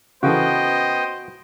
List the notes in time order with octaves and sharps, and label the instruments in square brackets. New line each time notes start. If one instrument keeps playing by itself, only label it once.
[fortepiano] C#3 E3 A4 [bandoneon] B3 G5 [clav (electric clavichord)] F#4 [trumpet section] C5 D#5